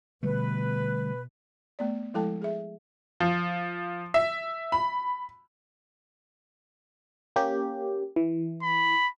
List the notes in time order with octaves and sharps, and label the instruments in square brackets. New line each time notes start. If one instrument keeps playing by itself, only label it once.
[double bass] B2 [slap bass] D3 G3 A3 [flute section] B4
[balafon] A3 B3 D5
F3 G#3 E4 A4 G5 A5
G#4 E5
[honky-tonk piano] F3
E5
B5
[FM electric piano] A#3 C#4 G4
E3
[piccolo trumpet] B5